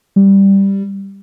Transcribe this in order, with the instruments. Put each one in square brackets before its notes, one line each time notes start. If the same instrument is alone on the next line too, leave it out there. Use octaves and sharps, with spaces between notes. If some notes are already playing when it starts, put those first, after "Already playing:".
[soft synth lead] G3